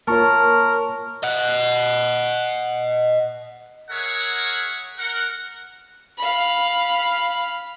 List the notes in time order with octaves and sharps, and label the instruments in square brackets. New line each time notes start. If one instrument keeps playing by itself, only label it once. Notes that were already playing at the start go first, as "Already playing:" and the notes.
[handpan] A#3 F4 C#5 [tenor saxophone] A#4 [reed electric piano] A5 C#6
[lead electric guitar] D#5 F#5
[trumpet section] G#4 A#4 C#5 E5 F#5
A#4 F#5
[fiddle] F5 B5